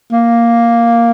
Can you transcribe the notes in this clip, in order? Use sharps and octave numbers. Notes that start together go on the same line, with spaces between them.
A#3